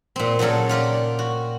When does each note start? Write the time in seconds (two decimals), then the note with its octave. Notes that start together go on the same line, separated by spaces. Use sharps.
0.16 A#2 C4
0.39 A#2 C#3 F#3 A4 A#4
0.69 F4 G4 A#4 D5
1.19 F#4